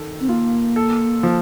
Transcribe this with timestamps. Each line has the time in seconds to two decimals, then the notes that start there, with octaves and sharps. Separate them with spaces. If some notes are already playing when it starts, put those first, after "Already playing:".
Already playing: D#3 A4
0.20 C4
0.29 A#3 F4
0.76 A4
1.23 F3